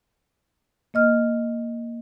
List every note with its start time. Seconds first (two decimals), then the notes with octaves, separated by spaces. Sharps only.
0.94 A#3 D#5 F6